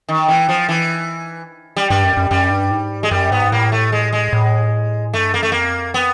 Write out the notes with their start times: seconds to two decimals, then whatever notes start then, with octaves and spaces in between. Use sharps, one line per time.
0.09 D#3
0.28 E3
0.49 F3
0.69 E3
1.77 G3
1.90 G2 G3
2.04 F#2
2.17 F#2
2.31 F#2 G3
2.50 G2
2.71 G#2
3.03 G#3
3.11 F#2 G3
3.31 G#2 B3
3.52 A2 A#3
3.72 A3
3.92 G#3
4.13 G#3
4.33 A2
5.14 G2 A3
5.34 F#2 A#3
5.43 A3
5.52 F2 A#3
5.94 B3